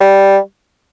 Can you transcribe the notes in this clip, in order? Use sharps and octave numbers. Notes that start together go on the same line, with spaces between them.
G3